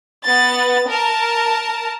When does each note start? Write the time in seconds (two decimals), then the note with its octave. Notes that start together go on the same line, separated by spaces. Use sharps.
0.25 B3 A6
0.89 A#4 A5